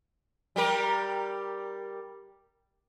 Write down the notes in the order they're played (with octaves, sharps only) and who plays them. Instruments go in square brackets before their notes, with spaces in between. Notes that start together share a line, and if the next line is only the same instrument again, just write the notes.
[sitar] G3 G4 A#4